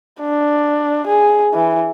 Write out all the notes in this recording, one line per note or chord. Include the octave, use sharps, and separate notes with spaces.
D4
G#4
E3